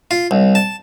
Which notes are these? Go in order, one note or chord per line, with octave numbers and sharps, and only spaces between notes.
F4
C2
A5